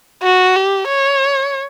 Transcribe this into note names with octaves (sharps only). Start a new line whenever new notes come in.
F#4
G4
C#5